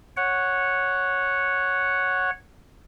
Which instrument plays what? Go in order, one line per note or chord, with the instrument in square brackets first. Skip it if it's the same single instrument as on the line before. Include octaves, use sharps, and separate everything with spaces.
[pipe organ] C#5 F#5